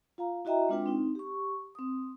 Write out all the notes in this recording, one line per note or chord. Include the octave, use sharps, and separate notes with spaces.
F4 F5 A#5
E4 F#4 D#5 E5 G5 A#5
G#3 C4 D4 F4 B4 G5
C4 D#4
G4 C#6
C4 D#6